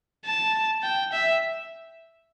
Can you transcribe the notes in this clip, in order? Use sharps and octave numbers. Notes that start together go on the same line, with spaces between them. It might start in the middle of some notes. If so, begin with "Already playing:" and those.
A5
G5
E5